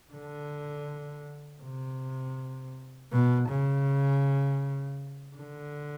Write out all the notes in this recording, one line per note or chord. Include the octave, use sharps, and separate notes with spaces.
D3
C3
B2
C#3
D3